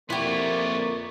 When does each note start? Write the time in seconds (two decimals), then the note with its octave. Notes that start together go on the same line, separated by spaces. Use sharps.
0.10 F2 A#3 B3 E4 F4 G4 D5 C#6